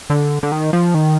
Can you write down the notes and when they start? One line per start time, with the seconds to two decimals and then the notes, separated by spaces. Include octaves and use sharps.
0.10 D3
0.43 D3
0.52 D#3
0.73 F3
0.94 D#3